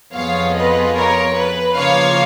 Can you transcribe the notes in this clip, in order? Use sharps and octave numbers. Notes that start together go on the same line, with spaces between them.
F2 F3 B3 F4 G#4 C#5 F5
B4 D#5
A#4 C#5
B4
C#3 F3 A#3 F4 C#5 F5